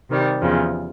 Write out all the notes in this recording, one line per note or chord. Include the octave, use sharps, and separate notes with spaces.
C3 D#3 G3
E2 C#3 F3